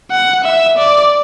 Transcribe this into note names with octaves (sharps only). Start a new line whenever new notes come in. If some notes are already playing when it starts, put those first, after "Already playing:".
F#5
E5
D5